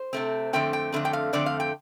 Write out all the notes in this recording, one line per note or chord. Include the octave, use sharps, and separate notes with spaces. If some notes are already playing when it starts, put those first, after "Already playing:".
Already playing: C5
C3 A3 C4
F2 D3 A3 C4 G5
G5
F2 D3 A3 C4
G5
F5
F2 D3 A3 C4 D5
F5
G5